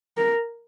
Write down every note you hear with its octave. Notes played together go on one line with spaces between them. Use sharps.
A#4